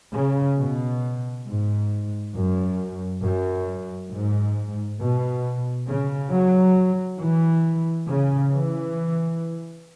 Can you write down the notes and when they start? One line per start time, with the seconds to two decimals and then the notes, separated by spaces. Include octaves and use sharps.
0.14 C#3
0.58 B2
1.47 G#2
2.35 F#2
3.23 F#2
4.11 G#2
5.00 B2
5.87 C#3
6.32 F#3
7.20 E3
8.08 C#3
8.52 E3